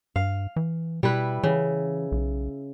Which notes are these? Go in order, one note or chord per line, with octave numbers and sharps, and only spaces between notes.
G2 F5
E3
B2 G3 E4 B4
C#3 E3
B1